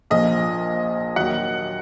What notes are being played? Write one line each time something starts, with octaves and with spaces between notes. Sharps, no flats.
A#1 A#2 F3 D#5
D#2 D#3 F#3 F#5